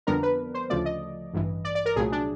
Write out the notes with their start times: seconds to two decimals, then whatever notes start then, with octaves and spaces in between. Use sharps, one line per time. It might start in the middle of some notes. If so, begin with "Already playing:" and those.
0.07 F2 D3 G3 B3 D4 A#4
0.23 B4
0.54 C5
0.70 D2 C#3 F3 A3 D5
0.85 D#5
1.33 A1 G2 E3
1.65 D5
1.75 D5
1.86 A#4
1.96 C2 A#2 F#3 A3 G#4
2.12 D4